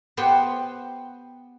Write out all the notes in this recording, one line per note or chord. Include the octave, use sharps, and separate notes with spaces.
B3 G4 C5 F#5 G5